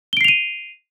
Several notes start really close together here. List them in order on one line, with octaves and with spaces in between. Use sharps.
G7 D7 C7 F7 D#7